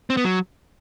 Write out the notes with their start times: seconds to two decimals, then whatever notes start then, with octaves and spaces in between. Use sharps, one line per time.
0.10 C4
0.17 B3
0.24 F#3